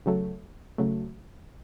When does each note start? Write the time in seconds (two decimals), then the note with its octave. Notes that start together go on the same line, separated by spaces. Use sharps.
0.06 C#3 F#3 A3
0.78 C#3 F#3 A3